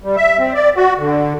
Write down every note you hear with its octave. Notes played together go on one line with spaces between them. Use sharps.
G3
E5
C4
D5
F#4
D3